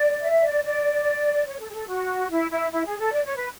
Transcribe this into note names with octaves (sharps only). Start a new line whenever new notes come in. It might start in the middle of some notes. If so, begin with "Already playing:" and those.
Already playing: D5
E5
D5
D5
C#5
A4
G#4
A4
F#4
E4
E4
E4
G#4
A4
D5
C#5
B4